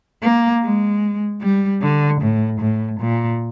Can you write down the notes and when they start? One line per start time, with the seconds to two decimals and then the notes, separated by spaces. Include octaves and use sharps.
0.22 A#3
0.62 G#3
1.41 G3
1.82 D3
2.21 A2
2.61 A2
3.00 A#2